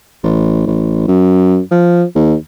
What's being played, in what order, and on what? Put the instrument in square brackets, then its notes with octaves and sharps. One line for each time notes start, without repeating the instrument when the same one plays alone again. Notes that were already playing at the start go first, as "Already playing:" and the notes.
[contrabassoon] A1
A1
F#2
F3
D#2